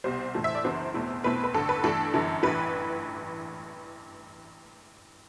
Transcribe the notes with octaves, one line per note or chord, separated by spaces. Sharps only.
C2 B2 G3 C5
A2 E3 A3
E5
D5
F#1 F#2 E3 B3 D4 C5
E2 B2 A3 C4 E4
B1 B2 A3 C4 E4 B4
B4
A1 G2 D3 A4
B4
G2 E3 A3 D4 A4
G1 F#2 E3
A1 G2 E3 B4